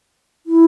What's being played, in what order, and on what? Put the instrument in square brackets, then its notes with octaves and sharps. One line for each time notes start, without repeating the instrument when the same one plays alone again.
[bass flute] E4